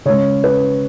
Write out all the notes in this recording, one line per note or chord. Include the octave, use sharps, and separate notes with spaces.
C#3 G#3 C#5
B4